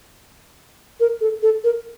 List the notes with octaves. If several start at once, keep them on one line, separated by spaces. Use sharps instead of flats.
A#4
A4
A4
A#4